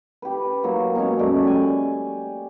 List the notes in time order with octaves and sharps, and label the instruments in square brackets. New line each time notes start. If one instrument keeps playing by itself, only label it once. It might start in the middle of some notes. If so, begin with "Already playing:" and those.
[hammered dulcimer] G4 B4
F#3 A#3
B2 G#3 C#4 C#5
F#2 A3 D5
G4 D5 G#5